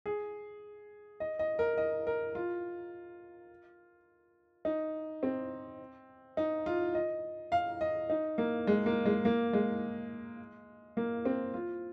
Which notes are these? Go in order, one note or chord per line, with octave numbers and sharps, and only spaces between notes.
G#4
D#5
D#5
A#4
D#5
A#4
F4
D#4
C4
D#4
F4
D#5
F5
D#5
D#4
A#3
G#3
A#3
G#3
A#3
G#3
A#3
C4
F4